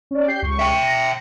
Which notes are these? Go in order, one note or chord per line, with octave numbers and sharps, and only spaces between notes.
C#4 D5
G4 G6 C7
C#2 C#6
E5 G5
A#6